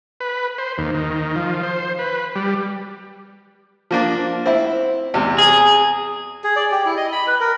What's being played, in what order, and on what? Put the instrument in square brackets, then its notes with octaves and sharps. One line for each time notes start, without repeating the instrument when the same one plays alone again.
[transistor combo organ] B4
C5
D#2
D#3
F3
C5
B4
G3
[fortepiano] F3 A#3 D4
C4 E4
E2 C3
[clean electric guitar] G#4
[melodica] G#4
D5
G4
E4
D#5
B5
B4
A#4